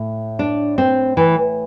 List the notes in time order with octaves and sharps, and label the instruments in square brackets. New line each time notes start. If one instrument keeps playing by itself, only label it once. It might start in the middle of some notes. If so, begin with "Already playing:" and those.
Already playing: [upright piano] A2
[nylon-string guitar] D4
C4
E3